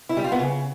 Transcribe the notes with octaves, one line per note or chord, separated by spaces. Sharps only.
E4
G3
F4
B3
C#3